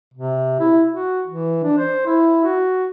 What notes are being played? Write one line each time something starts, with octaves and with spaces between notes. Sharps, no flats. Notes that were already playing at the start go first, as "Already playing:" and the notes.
C3
E4
F#4
E3
D4
C5
E4
F#4